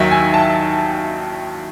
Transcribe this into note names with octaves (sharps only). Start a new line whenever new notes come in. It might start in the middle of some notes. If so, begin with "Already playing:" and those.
Already playing: D#2 D#3 F#3 E5
G#5
A5